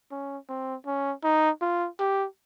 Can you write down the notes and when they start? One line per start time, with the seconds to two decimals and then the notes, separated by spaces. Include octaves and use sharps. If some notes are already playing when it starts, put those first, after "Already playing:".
0.11 C#4
0.49 C4
0.86 C#4
1.24 D#4
1.62 F4
1.99 G4